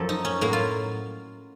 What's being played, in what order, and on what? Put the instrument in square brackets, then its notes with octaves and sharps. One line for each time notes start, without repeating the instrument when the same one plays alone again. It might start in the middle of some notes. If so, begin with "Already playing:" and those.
Already playing: [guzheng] F#2 F3 A4
D#4
C#4
A2 F#3 A#3
F4